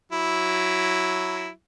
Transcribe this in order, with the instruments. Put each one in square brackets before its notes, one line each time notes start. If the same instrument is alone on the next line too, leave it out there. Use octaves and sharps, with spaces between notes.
[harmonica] F#3 E4